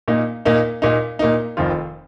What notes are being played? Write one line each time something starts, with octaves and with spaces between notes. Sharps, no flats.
A#2 A#3 D#4
A#2 A#3 D#4
A#2 A#3 D#4
A#2 A#3 D#4
F1 F2 D#3 C4 F4